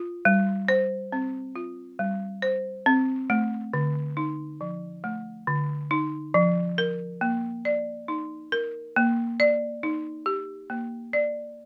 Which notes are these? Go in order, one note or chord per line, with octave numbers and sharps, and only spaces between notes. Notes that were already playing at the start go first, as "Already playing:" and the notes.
Already playing: F4
G3
C5
C4
F4
G3
C5
C4
A3
D3
D#4
F3
A3
D3
D#4
F3
A#4
A#3
D5
D#4
A#4
A#3
D5
D#4
G4
A#3
D5